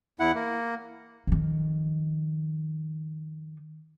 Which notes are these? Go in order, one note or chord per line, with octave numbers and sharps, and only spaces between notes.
E2 E4 F#5
A#3
F2 D#3